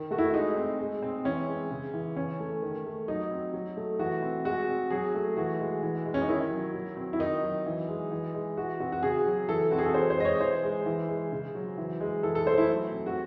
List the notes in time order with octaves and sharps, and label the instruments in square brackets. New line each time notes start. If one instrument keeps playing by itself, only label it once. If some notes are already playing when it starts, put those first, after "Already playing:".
Already playing: [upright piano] D#3
A3 F#4
E4
G#3 D#4
C4
G#3
C4
E3 C#4
G#3
C#3
E3
E3 C#4
A3
D#3
A3
F#3 D#4
C4
F#3
A3
E3 F#4
C4
G#3 F#4
C4
F#3 G#4
A3
E3 F#4
G#3
E3
G#3
C#4
D#4
D#3 E4
F#3
F#3
C4
E4
D#3 D#4
F#3
E3
G#3
E3
G#3
E3 F#4
C4 F#4
F#4
C#3 G#4
F#3
E3 A4
C4 F#4
G#4
A4
E3 C5
C5
G#3 D#5
C#5
E3 C5
G#3
E3
G#3
C#3
F#3
E3
G#3
E3 A4
A4
A3 C5
E4
F#3
C4
F#4